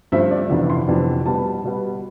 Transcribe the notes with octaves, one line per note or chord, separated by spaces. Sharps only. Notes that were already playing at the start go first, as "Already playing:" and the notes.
G2 F3 A3 C4 E5
D5
F2 C3 E3 B3 D4
C6
F2 C3 E3 B3 D4
B2 G3 B3 A5
B2 G3 B3